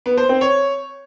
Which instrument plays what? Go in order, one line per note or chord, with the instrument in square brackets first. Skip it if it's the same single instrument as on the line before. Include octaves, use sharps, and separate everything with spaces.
[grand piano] B3
C5
C4
C#5